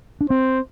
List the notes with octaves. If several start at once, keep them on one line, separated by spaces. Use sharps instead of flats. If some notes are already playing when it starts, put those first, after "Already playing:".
D4
C4 C5